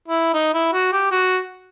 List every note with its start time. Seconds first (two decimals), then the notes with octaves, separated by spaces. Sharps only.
0.08 E4
0.34 D#4
0.54 E4
0.73 F#4
0.93 G4
1.12 F#4